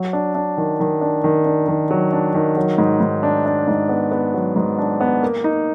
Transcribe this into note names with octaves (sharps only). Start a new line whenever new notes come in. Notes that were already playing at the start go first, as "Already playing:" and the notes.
Already playing: F#3
D4
D4
D#3
D#3
D4
D#3
D4
D#3
F#3
D4
D#3
F#3
G#2
G#2
D4
D4
G#2
B3
B3
F#3
G#2
D4
B3
A#3
D#4